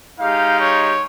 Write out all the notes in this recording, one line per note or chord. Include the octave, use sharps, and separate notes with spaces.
G#3 D#4 G4 F5
C#5